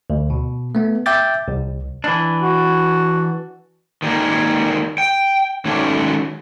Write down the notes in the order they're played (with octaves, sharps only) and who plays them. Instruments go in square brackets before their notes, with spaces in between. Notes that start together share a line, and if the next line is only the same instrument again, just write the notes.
[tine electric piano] D2
B2
A3 B3
E5 G5 D6 G6 A6
C2
[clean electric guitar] E3 D4
[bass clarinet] F#4
[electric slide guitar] D#3 G3 G#3 A#3
G5
D#3 F#3 G#3 A3 C#4 D4